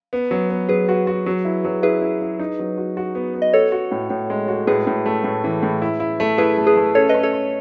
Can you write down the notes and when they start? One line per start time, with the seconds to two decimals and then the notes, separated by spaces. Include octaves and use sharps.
0.13 B3
0.31 F#3
0.50 B3
0.69 F#3 G#4 B4
0.89 F#4
1.07 F#4
1.26 F#3
1.45 E4
1.64 F#3
1.83 E4 G#4 B4
2.02 E4
2.21 E4
2.39 D#4
2.59 F#3
2.78 F#4
2.97 F#4
3.15 B3
3.34 B3
3.42 D#5
3.53 F#4 A4 C#5
3.72 F#4
3.91 A2
4.10 A2
4.30 G#3
4.48 F#4
4.67 A2 G#4 B4
4.87 A2
5.06 A3
5.24 A2
5.44 E3
5.63 A2
5.82 E4
6.00 E4
6.20 A3
6.38 E4 G#4 B4
6.58 A3
6.67 G#4 B4
6.77 A3
6.95 C#4 A4 C#5
7.09 C#4 B4 D#5
7.23 A4 C#5
7.33 C#4